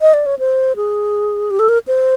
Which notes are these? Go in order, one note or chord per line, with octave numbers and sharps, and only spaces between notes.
D#5
D5
C#5
C5
G#4
G4
A4
A#4
C5